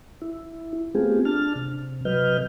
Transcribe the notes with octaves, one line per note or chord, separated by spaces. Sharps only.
E4
A3 B3 C4 F4 G4 G#4
D4 A5 F6
C3
C3 F#3 B4 D#5 F6 G6